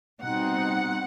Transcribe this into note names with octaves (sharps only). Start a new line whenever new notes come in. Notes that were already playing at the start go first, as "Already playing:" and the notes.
B2 G3 C4 D#4 F#5